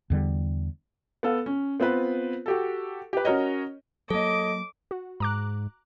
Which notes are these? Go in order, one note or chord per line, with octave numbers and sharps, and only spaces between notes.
E2 D3 G3
B3 A4 F5
C#4
B3 C4 F4 B4
F#4 G4 A4
G4 B4
C#4 F#4 A#4 C#5 D#5
F#3 A#3 A4 C#5 D#5 D6
F#4
G#2 A#5 D6 F#6